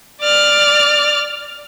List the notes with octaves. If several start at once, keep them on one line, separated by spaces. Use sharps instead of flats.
D5 F6